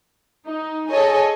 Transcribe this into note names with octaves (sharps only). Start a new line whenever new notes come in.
D#4
G#4 A4 C#5 D#5 G#5